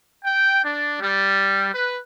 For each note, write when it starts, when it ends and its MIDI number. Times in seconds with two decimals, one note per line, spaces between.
0.24 0.63 79
0.64 0.96 62
1.01 1.68 55
1.74 1.97 71